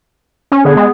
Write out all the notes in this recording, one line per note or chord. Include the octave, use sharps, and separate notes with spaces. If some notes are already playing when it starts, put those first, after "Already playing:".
C#4
D3 B3 G#4
G#3